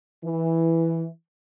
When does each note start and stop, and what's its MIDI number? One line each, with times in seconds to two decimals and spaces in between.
0.24 1.06 52